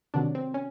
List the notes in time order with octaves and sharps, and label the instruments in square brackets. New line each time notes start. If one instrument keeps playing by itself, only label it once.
[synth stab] C3 D#3 F#3 D4
C4
C#4